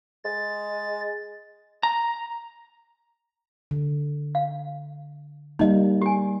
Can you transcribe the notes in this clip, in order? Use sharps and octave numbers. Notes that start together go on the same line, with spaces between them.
G#3 A6
A#5
D3
F5
G3 A#3 D#4 D#5
G4 G#5